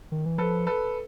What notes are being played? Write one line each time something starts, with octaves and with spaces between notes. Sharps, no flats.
D#3
E3
F3 A4 B4
A4 B4